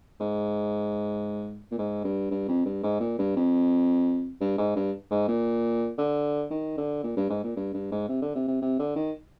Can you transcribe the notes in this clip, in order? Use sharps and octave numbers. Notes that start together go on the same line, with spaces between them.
G#2
A#2
G#2
G2
G2
F2
G2
G#2
A#2
G2
F2
G2
G#2
G2
G#2
A#2
D3
D#3
D3
A#2
G2
G#2
A#2
G2
G2
G#2
C3
D3
C3
C3
C3
D3
D#3